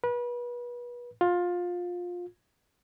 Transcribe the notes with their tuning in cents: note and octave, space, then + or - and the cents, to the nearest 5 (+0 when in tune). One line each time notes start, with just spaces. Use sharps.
B4 -30
F4 +20